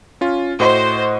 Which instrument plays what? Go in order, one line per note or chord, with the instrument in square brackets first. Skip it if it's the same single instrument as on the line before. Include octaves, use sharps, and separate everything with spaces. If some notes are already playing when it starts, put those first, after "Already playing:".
[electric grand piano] C#4 F4
[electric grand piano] A2 F#4 D#5 [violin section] C5